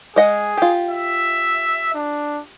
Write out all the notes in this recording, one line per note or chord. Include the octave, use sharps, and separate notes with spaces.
G#3 G#4 D#5 F#5
F4 G4
E5
D4